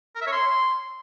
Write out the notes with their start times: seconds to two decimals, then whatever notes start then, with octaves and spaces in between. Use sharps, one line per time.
0.16 A#4
0.21 E5
0.27 C#5
0.32 C6